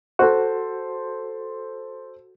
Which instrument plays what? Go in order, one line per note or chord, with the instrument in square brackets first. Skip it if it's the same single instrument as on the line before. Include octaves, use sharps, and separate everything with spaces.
[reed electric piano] F#4 [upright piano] A4 C5